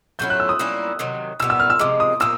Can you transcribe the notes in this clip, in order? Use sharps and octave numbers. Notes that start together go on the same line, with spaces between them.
F#3 A3 C#4 E4 G6
F#6
E6
D#6
G3 A#3 C#4 E4
C3 D#3 F#3
B2 G3 B3 E6
E6
F6
E6
C3 F3 G#3 D6
D#6
A#2 F3 A#3 E6